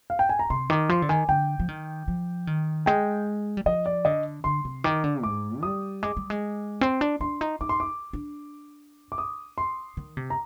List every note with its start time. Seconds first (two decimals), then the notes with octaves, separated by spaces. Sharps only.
0.10 F5
0.19 G5
0.29 G#5
0.39 A#5
0.50 C3 C6
0.70 D#3 D6
0.89 F3 C6
1.02 D3
1.09 D#3 G#5
1.29 D3 G5
1.60 F3
1.68 D#3
2.08 F3
2.47 D#3
2.86 G#3 G5
3.57 G3
3.66 F3 D#5
3.86 D5
4.05 D3 D#5
4.44 D3 C6
4.65 C3
4.84 D#3 D6
5.04 D3
5.23 G#2 D6
5.63 G3 D#6
6.03 G#3 D6
6.17 G3
6.30 G#3
6.81 C4 C6
7.01 D4
7.20 D4 C6
7.41 D#4
7.61 D#4 D6
7.69 C6
7.80 D6
8.13 D4
9.12 D6
9.18 D#6
9.58 C6
9.97 D#3
10.17 C3
10.30 A#5